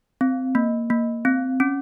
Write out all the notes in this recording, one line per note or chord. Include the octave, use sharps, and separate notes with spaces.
C4
A#3
A#3
C4
C#4